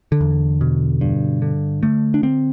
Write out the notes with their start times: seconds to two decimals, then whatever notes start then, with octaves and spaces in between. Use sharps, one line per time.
0.12 D3
0.20 E2
0.61 B2
1.01 G2
1.42 D3
1.83 D3 A3
2.14 D4
2.23 D3 C4